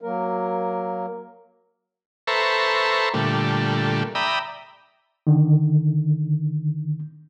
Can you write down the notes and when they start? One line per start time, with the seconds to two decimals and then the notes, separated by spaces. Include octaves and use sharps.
0.01 F#3 A#3 A#4
2.27 A4 B4 C5 E5 A#5 C#6
3.14 A#2 D3 G3 A3
4.15 D5 E5 G5 A#5 B5 D#6
5.27 D3 D#3